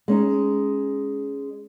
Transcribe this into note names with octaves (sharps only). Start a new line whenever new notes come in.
G#3 C#4 D#4